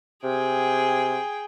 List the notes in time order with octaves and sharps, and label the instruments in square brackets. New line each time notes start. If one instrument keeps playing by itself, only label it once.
[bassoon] C3 [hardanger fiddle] G#4 G5